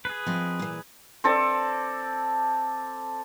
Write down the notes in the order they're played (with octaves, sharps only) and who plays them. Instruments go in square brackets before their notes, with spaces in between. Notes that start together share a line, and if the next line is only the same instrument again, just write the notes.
[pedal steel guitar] G#4 B4
[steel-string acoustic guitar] F3 C4 D#5
A#2 E3
[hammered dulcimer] C4 A4 D5